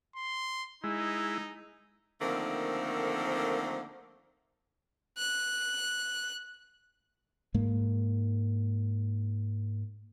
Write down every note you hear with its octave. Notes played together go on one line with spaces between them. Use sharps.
C6
G#3 D#4 E4
D3 D#3 F3 A3 A#3 C4
F#6
G#2 G#3 A#3